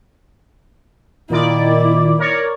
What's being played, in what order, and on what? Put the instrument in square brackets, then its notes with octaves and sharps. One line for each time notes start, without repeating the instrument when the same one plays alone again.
[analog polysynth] A#2 D#3 D5 [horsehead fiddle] E4
[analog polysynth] A#4 C#5 D5